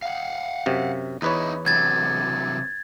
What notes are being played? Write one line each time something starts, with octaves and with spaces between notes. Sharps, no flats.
F5 F#5
F#2 C3
E2 D#4 E4 B4 C#5
C3 E3 F#3 G#6 A6